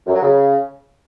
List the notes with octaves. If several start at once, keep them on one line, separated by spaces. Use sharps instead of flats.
F#2
F#3
C#3